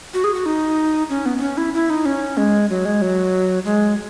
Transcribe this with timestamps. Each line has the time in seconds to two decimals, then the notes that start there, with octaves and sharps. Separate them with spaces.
0.14 F#4
0.24 G#4
0.34 F#4
0.46 D#4
1.09 C#4
1.26 B3
1.38 B3
1.41 C#4
1.57 E4
1.74 E4
1.90 D#4
2.06 C#4
2.37 G#3
2.70 F#3
2.85 G#3
3.02 F#3
3.65 G#3